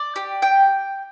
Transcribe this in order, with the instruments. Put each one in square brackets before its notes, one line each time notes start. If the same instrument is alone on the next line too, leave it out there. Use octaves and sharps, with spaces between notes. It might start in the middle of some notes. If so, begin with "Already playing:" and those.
Already playing: [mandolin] D5
G4
G5